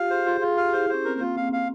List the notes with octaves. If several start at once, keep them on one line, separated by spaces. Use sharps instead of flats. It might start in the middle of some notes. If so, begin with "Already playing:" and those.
Already playing: F4 G4 F5
G#4 C5
F4 G#4
F4 G#4
G4 F5
E4 C5
E4
C#4 C5
C4 A#4
A#3
C4 F4
C4 F5
F5